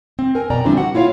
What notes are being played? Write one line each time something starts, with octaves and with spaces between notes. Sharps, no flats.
C4
A#4 G#5
F2 B2 D5 G5 A#5
D3 E3 F3 G3 C4 D4
F#4 F#5
A#3 E4 F4 C#5 F5